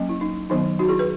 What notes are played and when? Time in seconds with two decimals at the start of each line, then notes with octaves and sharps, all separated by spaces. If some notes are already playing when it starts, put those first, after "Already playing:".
Already playing: F#3 A#3 C#4
0.09 E4
0.21 D#4
0.50 D#3 F#3 B3 D#4
0.79 D#4 F#4
0.88 E4 G#4
0.99 G#4 B4